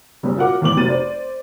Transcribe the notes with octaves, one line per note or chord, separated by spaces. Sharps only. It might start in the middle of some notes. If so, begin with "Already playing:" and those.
F#1 G3 C#4
F4 F#4 A#4 F#5 D6
G#1 E2 A#3 D6 F#7
F1 F#3 A6 D#7
C5 D5